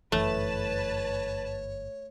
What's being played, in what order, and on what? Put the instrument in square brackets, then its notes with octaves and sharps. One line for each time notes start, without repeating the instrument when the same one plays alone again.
[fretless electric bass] G1 F#2 E3 [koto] A3 [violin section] B4 A5 [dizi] C#5